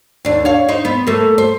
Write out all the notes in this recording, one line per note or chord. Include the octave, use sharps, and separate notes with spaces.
D#2 D4
C#5 F5
D#4 C5
B3
A3 A#3
C5